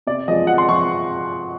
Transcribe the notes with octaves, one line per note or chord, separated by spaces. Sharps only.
C3 D5
F3 G#3 D#5
C3 F#5
C6
F3 C#6